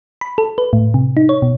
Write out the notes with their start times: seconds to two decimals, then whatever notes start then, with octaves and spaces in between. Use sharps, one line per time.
0.21 B5
0.38 A4
0.58 B4
0.73 A2
0.94 C3
1.17 D#4
1.29 C#5
1.42 B2